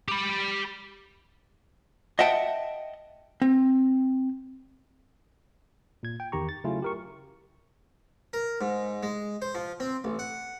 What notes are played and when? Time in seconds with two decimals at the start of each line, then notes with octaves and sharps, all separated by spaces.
0.08 G4 B5
2.19 D#5 E5 F#5 G5 A5
3.42 C4
6.03 A#2 G#6
6.20 G5
6.32 E2 D#3 G4 A#5 C#6
6.49 A6
6.64 C#3 F#3 A3 C#4 E4 F4
6.82 G4 A#4 C#6
8.33 A#4
8.61 G#2
9.03 G#3
9.42 C5
9.55 F3
9.80 C4
10.04 A1
10.19 F#5